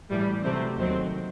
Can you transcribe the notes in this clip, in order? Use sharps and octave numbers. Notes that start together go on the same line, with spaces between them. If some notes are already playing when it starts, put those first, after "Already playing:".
A2 E3 G3
C3 F#3 A3 C4
D#2 D#3 F#3 C4